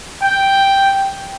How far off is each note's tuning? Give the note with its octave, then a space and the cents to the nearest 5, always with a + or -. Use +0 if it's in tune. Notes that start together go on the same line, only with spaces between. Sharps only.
G5 +0